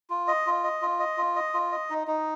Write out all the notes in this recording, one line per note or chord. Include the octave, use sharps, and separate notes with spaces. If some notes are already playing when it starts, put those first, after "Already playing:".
F4
D#5
F4
D#5
F4
D#5
F4
D#5
F4
D#5
D#4
D#4